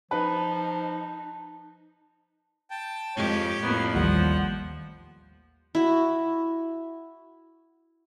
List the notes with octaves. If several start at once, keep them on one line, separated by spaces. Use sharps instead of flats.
F3 D#4 B4 A5
G5 A5
F2 G#3 G4 C#5
F2 A2 A#3 B3
A1 D#2 F3 G3 F#5
E4 F#4